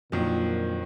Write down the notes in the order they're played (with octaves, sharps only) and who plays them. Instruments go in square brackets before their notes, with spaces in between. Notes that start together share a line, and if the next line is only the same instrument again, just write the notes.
[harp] F2 [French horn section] A#2 [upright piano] D3 D#3 F#3